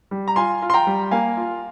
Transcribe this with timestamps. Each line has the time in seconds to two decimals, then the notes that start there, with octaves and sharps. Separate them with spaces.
0.11 G3
0.28 A#5
0.36 F4 G#5 C6
0.62 F4
0.70 C6
0.74 G5 A#5
0.87 G3
1.11 A#3 F5 G#5
1.37 F4